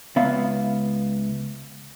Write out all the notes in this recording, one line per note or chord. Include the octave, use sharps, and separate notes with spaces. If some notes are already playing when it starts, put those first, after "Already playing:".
C#2 B3 E5 F5